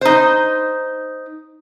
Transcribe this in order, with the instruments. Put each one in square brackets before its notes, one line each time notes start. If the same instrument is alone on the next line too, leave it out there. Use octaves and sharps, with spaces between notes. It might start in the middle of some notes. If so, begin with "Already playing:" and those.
[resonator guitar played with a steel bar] D#4 C5